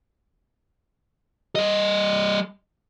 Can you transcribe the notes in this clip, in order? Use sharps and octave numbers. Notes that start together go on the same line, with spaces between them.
G3 D#5